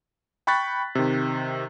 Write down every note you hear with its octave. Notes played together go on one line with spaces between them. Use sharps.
G5 B5 C#6 F#6 A6 B6
C3 D#3